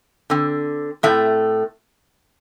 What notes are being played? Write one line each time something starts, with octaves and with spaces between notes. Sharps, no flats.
D3 C4
A2 A3 C4 E5